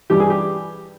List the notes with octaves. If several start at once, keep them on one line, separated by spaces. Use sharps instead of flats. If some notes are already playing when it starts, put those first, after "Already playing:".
G2 E3 G3 G4
G#4
G4